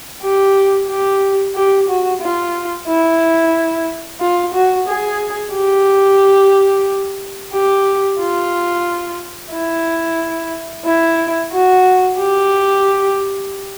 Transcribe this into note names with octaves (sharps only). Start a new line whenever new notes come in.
G4
G4
G4
F#4
F4
E4
F4
F#4
G#4
G4
G4
F4
E4
E4
F#4
G4